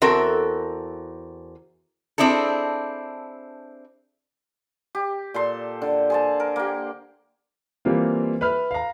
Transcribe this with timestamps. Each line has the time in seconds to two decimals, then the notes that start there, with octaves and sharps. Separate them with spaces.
0.02 E2 C4 F#4 A4 A#4
2.18 C4 D4 E4 G#4 A4
4.95 G4
5.34 A#2 A4 C6
5.82 D3
6.10 G#4 C5 A5
6.40 A#4
6.56 A#3 G4
7.85 E3 G3 A#3 C4 F4
8.41 B4 E5 B5 F6
8.71 F5 A#5